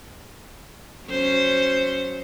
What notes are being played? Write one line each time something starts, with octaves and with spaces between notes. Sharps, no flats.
F#3 C#4 C5